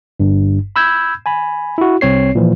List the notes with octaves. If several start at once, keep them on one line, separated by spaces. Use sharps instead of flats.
G1 G2
B5 E6 G6 G#6
G#5 B5
E4 F#4
C2 C4 C#5 C7
A#2 E3 F3